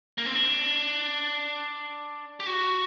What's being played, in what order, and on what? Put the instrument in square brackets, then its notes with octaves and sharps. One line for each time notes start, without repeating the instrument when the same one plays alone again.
[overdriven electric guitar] A#3
C4
D4
G4
F#4